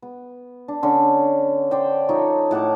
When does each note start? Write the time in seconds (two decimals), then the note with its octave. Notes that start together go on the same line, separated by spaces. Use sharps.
0.02 B3
0.68 D4
0.83 D3 C#4
1.71 C5 D5 G5
2.09 F3 D#4 A4 C#5
2.51 A2 F#5 A5 D6